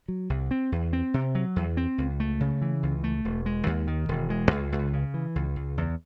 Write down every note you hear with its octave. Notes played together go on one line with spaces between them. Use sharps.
F#3
C2
C4
E2
C4
C3
F#3
E2
C4
C#2
A3
C#3
E3
C#2
A3
E1
G#3
D#2
D#3
E1
G#3
C#2
C#2
C#3
E3
C#2
C#2
E2